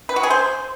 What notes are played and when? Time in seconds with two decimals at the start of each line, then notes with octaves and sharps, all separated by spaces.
0.09 B4
0.16 F#4
0.23 G#4
0.30 C5